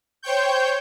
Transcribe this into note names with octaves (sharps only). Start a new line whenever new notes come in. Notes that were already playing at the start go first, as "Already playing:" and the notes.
C5 C#5 G5 C#6 G6